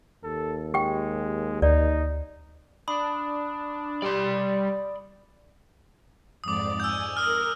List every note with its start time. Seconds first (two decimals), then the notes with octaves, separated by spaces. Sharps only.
0.24 D#2 A4
0.74 G#3 G4 G5
1.62 D2 D#4 D5
2.88 D4 B5 D#6
4.02 G3 D5 C6
6.44 F2 G#2 D5 D6 D#6
6.80 G#5 E6 G6
7.17 A#4 D#6 F6